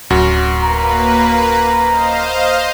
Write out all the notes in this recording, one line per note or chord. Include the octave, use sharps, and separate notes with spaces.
D1 F#2 F#4
A#3 B4 A#5
C5 D#5 F5